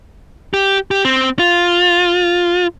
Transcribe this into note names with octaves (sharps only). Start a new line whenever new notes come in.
G4
G4
C4
F4